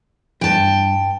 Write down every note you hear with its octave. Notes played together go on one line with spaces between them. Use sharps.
G2 G5 A5